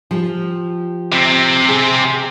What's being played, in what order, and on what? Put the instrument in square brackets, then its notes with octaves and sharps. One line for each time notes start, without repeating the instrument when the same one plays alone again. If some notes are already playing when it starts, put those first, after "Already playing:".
[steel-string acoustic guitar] F3 G4
[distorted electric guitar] C3 C4
[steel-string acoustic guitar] G#4